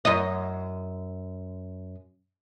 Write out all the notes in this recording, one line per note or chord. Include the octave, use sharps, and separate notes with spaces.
F#2 D#5